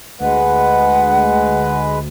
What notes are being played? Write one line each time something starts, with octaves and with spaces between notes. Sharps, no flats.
D2 G#3 B4 F#5